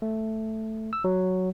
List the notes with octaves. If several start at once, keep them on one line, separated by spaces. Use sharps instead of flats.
A3
E6
F#3